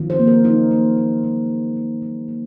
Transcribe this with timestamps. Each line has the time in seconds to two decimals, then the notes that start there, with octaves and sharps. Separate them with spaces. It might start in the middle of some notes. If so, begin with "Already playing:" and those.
Already playing: D#3 F3
0.10 C5
0.19 A#3
0.27 A#4
0.44 F#3 D#4
0.71 A#3
0.97 F3
1.24 G#3
1.50 F3
1.76 A#3
2.02 F#3
2.28 A#3